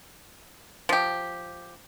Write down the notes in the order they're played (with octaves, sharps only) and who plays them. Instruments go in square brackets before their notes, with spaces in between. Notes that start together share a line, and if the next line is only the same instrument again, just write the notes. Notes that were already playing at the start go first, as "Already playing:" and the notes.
[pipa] F3 G4